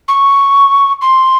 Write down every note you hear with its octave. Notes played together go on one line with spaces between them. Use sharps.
C#6
C6